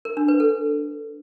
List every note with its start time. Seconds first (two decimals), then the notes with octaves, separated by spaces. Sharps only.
0.05 A#4
0.17 D4
0.28 B4
0.40 A4